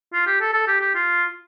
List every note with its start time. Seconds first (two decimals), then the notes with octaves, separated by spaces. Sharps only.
0.13 F4
0.26 G4
0.41 A4
0.53 A4
0.68 G4
0.81 G4
0.95 F4